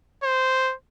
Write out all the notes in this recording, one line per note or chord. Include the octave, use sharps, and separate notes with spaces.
C5